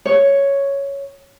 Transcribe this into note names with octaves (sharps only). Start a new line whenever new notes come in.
C#5